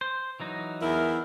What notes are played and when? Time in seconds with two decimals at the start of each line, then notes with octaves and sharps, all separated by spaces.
0.01 C5
0.40 E3 F#3 D#4
0.82 E2 E4 A#4